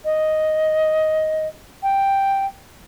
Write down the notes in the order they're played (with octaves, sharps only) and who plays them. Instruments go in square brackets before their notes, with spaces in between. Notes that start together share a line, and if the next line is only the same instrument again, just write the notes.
[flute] D#5
G5